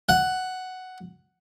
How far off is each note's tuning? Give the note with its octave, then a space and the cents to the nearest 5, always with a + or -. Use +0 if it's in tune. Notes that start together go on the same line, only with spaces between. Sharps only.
F#5 +5